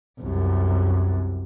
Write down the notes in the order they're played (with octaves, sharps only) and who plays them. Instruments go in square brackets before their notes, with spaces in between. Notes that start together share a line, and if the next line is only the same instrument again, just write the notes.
[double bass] C2 F#2